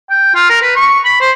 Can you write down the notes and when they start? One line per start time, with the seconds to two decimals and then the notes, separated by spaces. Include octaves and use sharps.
0.10 G5
0.35 F4
0.50 A#4
0.62 B4
0.76 C#6
1.05 B5
1.21 C5